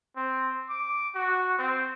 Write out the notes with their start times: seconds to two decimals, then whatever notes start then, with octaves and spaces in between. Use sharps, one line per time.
0.16 C4
0.70 D6
1.15 F#4
1.59 C4